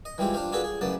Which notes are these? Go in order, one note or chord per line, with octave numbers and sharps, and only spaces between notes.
D#5
E3 G3 G#3 C4 F4 G4
D4 F4 G4 C5 F5
D4 F4 F#4 G#4 A4 B4
G#4
A1 F#2 C#3 B3 D5 A5